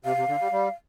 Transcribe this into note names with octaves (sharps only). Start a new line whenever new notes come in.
C3 F5
C3
D3
G3
G3